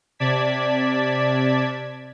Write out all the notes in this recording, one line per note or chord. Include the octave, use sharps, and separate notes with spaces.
C3 D5 A5 G#6 B6